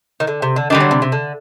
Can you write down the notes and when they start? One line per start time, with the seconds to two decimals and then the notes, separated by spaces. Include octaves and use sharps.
0.20 D#3
0.27 D3
0.42 C3
0.56 D3
0.70 D3 D#3 G3 D4
0.80 F#3
0.91 C3
1.02 C3
1.12 D3